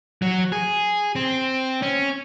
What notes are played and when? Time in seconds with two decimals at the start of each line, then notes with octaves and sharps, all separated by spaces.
0.22 F#3
0.52 G#4
1.15 C4
1.82 C#4